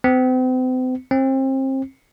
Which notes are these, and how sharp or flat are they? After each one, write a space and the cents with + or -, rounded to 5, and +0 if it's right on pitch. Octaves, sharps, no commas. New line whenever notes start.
C4 -40
C4 +30